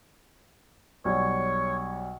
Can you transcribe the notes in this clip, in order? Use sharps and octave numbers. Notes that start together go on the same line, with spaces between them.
B1 G3 C#5